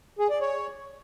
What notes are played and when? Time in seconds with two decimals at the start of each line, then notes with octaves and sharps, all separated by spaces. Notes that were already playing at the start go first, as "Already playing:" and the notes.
0.19 G#4
0.30 D5
0.41 C#5